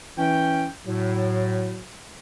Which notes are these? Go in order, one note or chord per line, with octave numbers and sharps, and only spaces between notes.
E3 C#4 G5
A2 F#3